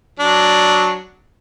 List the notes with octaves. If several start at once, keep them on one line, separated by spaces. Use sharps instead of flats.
F#3 D4